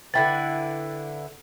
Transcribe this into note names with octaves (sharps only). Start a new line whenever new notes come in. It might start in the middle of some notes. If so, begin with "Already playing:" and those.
D3 E4 B4 G5 A6